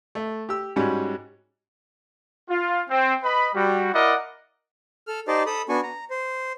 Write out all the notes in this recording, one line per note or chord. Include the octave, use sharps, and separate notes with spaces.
A3
G4 E6
G#2 G3 C#4 F#4
F4
C4
B4 D#5 B5
G3 F#4
E4 A#4 D5 D#5 F#5
A4 F6
D#4 G4 C5 D5 D#5 A5
A4 B5 D#6
B3 D4 F#4 G#5 C#6
A#5
C5